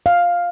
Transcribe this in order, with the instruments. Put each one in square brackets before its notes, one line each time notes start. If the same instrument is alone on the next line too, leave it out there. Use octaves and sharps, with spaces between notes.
[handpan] F5